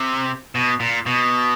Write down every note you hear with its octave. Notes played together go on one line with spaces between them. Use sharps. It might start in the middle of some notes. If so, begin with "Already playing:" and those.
Already playing: C3
B2
A#2
B2